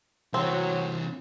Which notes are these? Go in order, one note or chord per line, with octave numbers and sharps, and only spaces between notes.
C3 E3 F#3 C4